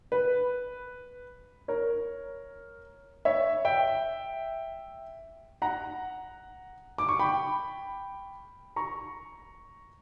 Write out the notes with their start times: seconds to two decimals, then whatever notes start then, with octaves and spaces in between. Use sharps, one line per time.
0.12 B4
1.68 A#4 C#5
3.25 C#5 E5
3.65 E5 G5
5.62 F#5 A#5
6.98 D6
7.09 C#6
7.19 G5 B5
8.76 A#5 C#6